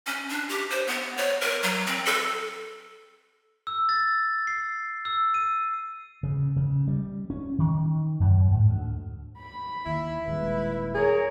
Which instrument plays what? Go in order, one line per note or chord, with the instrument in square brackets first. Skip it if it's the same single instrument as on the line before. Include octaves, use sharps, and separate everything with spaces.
[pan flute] C#4
D4
G4
C5
B3
C#5
A#4
F#3
C4
A4
[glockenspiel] E6
A6
C7
E6
D#7
[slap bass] C#3
C#3
G3
C#4
D#3
F#2
G#2
D2
[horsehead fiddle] B5
[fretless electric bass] D#2 [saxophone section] E4
[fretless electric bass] D#1 G#3 [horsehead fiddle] B4
[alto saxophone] G#4 [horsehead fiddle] A#4 C#5